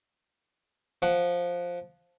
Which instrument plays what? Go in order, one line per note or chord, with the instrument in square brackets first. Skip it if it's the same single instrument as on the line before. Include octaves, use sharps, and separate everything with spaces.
[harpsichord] F3 F#5